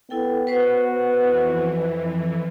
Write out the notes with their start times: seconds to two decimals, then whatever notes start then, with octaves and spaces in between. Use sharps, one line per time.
0.10 B3 E4 A4 G5
0.47 F#4 B4 C5
1.14 F2 E3